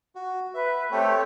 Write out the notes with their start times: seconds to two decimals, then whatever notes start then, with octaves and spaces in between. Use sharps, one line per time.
0.15 F#4
0.54 B4 E5
0.92 A3 C4 G4 C#5